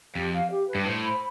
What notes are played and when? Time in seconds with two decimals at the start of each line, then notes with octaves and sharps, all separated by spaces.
0.15 F2 G4
0.32 F5
0.50 G4
0.68 B4
0.75 G2
0.86 A2 C5
1.04 B5